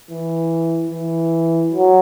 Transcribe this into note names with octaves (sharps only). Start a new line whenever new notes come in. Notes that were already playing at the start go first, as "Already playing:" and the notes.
E3
E3
F#3